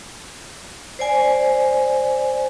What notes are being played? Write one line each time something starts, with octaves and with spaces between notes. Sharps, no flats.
C5 D5 G#5